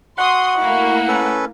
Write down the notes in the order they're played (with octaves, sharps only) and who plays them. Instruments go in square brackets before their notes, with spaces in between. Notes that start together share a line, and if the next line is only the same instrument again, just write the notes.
[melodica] F#4 [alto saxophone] F#5 [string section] C6 D#6
[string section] A3 A#3 E4
[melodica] C#4 A4 B4